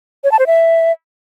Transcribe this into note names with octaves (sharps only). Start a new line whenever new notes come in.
C#5
A5
C5
E5